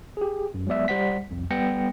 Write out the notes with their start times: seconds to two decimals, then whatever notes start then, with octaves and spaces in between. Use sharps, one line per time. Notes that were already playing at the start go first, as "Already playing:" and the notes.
0.17 G4 G#4
0.54 F#2
0.67 F#3 G#3 B3 D5 E5
0.88 G3 C5 F#5 B6
1.31 C2 F2
1.51 G3 B3 G5 A#6 C#7